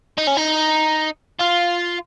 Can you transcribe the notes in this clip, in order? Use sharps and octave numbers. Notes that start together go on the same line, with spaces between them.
D#4
C#4
D#4
F4